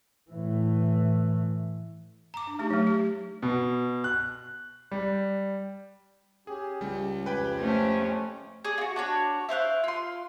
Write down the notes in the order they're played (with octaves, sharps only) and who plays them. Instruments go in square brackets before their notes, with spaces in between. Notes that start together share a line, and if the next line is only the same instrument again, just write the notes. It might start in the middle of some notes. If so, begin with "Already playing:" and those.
[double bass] A2 E3
[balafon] A#5 D6
D4
A3 D#4 G4 G#4
F#3 A3
G4
[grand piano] B2
F#6
G3
[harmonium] C#4 G4 [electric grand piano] G#4
[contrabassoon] C#2 [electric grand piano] G3 G#3
[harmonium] F2 G4 G#5 [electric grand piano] B4 G5 B5
[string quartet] A3 C4 C#4
[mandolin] G#4 D5
F4 F#4
D4 F#4 C#5
E4 C5 F5 F#6
F4 C6